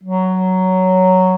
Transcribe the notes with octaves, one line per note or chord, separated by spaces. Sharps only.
F#3